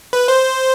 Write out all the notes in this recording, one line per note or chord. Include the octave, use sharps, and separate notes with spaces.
B4
C5